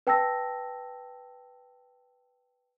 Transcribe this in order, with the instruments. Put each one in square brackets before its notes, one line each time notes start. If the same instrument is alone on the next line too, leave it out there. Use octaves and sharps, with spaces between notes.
[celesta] B4 G5 A5 E6 A#6